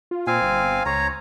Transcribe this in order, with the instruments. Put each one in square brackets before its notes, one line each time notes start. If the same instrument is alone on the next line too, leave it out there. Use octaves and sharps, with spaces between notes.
[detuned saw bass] F4
[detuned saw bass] A#2 [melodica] C4 F5 G#5
[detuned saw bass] G1
[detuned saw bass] C#2 [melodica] C#5 A#5